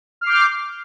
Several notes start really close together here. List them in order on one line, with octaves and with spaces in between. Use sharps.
F6 C7 D6 G6